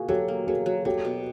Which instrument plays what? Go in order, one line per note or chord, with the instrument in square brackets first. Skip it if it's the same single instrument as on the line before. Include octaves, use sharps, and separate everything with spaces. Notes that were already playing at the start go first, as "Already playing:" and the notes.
Already playing: [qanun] A#3 [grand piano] F#4 G#4
[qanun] F#3 [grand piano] G4 A4
[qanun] A#3
[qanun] F#3 [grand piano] G#4 A#4
[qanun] F#3
[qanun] F#3 [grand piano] G4 A4
[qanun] B2